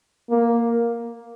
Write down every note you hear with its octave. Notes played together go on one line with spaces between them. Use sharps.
A#3